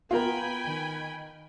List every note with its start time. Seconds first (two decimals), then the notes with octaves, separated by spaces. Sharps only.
0.11 B3 F4 A#4 G5 G#5 B5
0.65 D#3